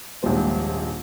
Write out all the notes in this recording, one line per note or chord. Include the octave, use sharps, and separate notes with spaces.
D#1 A#1 G#2 G3 C5